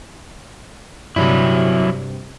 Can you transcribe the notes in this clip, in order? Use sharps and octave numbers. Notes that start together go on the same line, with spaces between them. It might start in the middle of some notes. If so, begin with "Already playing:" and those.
G2 C3 F#3 E4